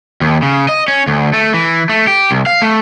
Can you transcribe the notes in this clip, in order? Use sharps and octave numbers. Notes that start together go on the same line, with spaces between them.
D#2
C#3
D#5
C#4
D2
A3
E3
A3
G4
C2
F5
A3